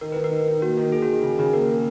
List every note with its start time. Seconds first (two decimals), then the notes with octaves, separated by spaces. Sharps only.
0.01 D#3 A#4
0.12 D#3 B4
0.24 A#4
0.32 D#3
0.48 D#4
0.62 A#3 F#4
0.77 D#3
0.92 D#3 G#4
1.02 F#4
1.07 D#3
1.13 F#4
1.23 C#3 G#4
1.39 C#3
1.53 A#3 A#4
1.69 A#3